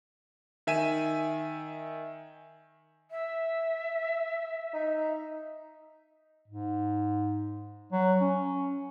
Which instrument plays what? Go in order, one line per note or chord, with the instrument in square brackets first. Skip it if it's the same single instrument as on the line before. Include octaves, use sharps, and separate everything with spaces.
[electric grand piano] D#3 E5 G#5 D#7
[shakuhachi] E5
[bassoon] D#4
[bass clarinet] G#2
F#3
C#4